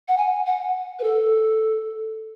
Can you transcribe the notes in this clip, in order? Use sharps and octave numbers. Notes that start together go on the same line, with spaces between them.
F#5
G#5
F#5
B4
A4